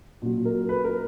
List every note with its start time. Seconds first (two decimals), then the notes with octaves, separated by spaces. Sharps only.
0.22 A#2 F#3
0.45 A#4
0.69 B4
0.84 A#4